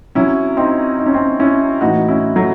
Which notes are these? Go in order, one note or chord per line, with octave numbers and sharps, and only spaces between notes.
C3 F#3 C#4 E4
C4 D#4
D#4
C#4
C4 D#4
C#4 E4
A2 E3 D#4 F#4
C#4 E4
F#3 A3